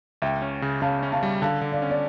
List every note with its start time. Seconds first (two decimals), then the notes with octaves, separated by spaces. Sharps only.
0.22 C#2 E5 G5
0.42 C#4
0.62 C#3
0.82 C#3 F5 A5
1.03 C#4
1.12 F5 A5
1.23 G3
1.42 D3 F5 A5
1.61 D3
1.72 D5 F5
1.82 C#4
1.90 D5